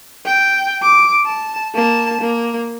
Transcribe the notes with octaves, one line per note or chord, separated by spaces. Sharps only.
G5
D6
A5
A#3 A5
A#3